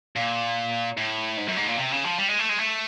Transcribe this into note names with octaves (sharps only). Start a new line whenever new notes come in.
A#2
A2
G#2
F#2
G#2
A#2
C3
C#3
F3
G3
G#3
A3
G#3
A3